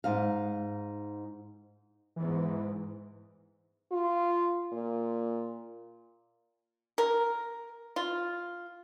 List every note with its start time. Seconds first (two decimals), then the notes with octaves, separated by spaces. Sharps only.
0.04 G#2 D#4 F5
2.16 E2 G#2 E3
3.92 F4
4.72 A#2
6.98 A#4
7.96 F4